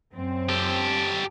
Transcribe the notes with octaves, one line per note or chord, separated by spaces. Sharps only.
F#2 C4
G4 A4